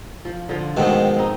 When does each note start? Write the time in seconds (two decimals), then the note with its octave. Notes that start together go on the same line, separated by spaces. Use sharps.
0.25 F3
0.49 D3 F3 F4
0.77 G#2 B2 D#3 A3 C4 D5
1.17 C4 D#4